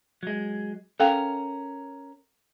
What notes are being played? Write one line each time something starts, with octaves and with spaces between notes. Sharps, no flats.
F#3 G#3
C#4 A4 A#4 F5 G5